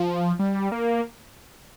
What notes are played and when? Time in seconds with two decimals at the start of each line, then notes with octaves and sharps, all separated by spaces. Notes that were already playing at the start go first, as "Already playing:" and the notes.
Already playing: F3
0.39 G3
0.72 A#3